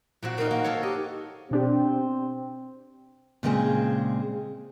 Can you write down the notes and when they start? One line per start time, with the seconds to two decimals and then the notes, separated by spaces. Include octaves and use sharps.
0.23 A#2 C4 F#4
0.38 C4 D#4 A#4
0.51 A#3 F#5
0.64 A4 A#4 C#5
0.83 G4 D#5
1.51 B2 C4 D4 G4
3.43 A#2 C#3 G#3 C4 G#4